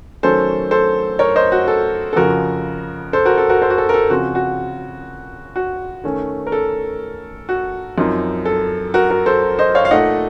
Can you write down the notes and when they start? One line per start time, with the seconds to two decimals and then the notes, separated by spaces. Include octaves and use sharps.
0.23 D#3 F#3 A3 C#4 A4 C5
0.71 A4 C5
1.19 A#4 C#5
1.36 C5 D#5
1.52 F#4
1.68 A4
2.13 A4
2.16 F2 C#3 F3 F#4 A#4
3.13 A4 C5
3.26 F#4 A#4
3.38 A4
3.49 F#4 A#4
3.62 A4 C5
3.70 F#4
3.78 A4
3.89 A#4
3.94 A4
4.10 C#3 F3 C4 F#4
4.35 F#4
5.56 F#4
6.04 D#3 A3 C#4
6.47 A#4
6.52 A4
7.49 F#4
7.98 F#2 F3 C4 D#4
8.45 A4
8.94 F#4 A#4
9.10 F#4 A#4
9.26 A4 C5
9.59 C5 D#5
9.75 C#5 F5
9.85 F5
9.91 A#2 A3 D#4 D#5 F#5